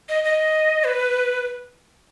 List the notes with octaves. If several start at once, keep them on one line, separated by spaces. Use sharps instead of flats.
D#5
D#5
B4